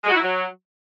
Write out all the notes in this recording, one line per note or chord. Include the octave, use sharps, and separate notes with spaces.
G#3
F#4
E4
F#3